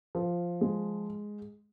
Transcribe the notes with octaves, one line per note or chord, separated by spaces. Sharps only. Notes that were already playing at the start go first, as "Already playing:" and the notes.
F3
G#3